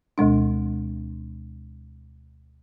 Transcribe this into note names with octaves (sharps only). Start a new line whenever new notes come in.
D2 B2 G#3 D4